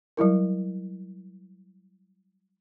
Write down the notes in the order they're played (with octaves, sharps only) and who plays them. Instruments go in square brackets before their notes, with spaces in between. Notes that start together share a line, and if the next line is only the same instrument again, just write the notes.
[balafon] F#3 G3 E4 A#4